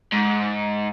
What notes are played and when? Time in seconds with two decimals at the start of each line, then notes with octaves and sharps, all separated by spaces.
0.12 G#2